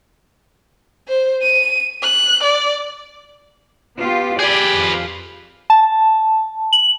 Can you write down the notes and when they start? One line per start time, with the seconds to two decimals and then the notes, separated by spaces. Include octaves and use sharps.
1.08 C5
1.42 D#7
2.02 F#6
2.43 D5
3.98 B3 F4 G4
4.39 G4 G#4 B4 D5
4.75 F2 F4
5.70 A5
6.73 F#7